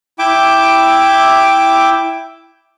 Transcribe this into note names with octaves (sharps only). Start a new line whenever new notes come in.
E4 E5 G5 D6